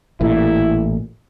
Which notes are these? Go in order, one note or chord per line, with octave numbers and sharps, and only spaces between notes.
A1 A#2 E4